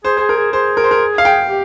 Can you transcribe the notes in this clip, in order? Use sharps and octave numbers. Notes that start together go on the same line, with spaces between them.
G#4 C5
G#4 C5
A#4
G#4
G#4 C5
A#4
C5
A#4
F5
G5
G4